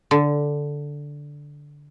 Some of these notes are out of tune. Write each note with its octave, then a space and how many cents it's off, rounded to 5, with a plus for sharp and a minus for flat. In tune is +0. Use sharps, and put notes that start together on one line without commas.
D3 -5